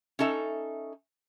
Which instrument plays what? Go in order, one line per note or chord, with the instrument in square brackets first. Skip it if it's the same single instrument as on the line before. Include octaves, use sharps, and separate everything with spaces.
[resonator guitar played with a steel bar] C#4 D#4 A4 E5